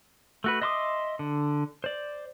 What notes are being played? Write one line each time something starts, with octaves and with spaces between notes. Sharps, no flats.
A3 F#4 B4
D#5 E5 C6 D6 D#6
D3
C5 D5